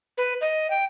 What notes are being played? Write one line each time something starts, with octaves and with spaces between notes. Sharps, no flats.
B4
D#5
G5